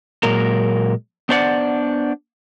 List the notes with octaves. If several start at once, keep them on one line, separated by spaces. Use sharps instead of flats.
A#2 F#3 G#3 A#3 A#4
B3 D4 C5 D5 F#5